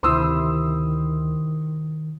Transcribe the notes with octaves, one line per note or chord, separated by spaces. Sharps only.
D2 C3 D#3 E4 C5 C6 D#6 E6